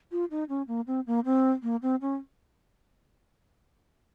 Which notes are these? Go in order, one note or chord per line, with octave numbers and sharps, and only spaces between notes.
F4
D#4
C#4
A#3
C4
A#3
C4
A#3
C4
C#4